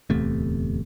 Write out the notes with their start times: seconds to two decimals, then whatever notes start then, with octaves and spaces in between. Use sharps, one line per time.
0.10 D1 E2 C3 A3